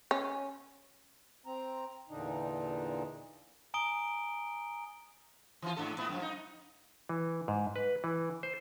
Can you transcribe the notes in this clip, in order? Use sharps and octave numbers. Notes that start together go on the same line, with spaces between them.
C#4
C4 A#5
E2 A#2 D3 D4 D#4
G#5 A#5 D#6 D7 G7
E3 F3 F4
G#2 D4 A4
A2 B3 E4
F#2 F3
D#4
E3
G#2
B4
E3
C5